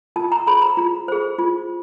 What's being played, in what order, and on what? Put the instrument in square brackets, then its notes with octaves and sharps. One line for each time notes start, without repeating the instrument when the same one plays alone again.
[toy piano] F4 A5
A#5
G#4 C5 B5
A#5
F4
G#4 C5
F4